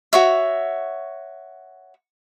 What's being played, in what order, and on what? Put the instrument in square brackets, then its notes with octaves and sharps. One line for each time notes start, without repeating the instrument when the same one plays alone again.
[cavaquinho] F#4 C#5 E5